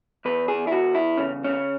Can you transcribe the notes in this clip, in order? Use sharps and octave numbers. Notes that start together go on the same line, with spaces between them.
E2 B4
G#4
E4
E2 F#4
E4
C#3 C#4
C#4